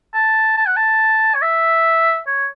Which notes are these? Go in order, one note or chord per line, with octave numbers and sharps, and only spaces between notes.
A5
A5
F#5
A5
C#5
E5
C#5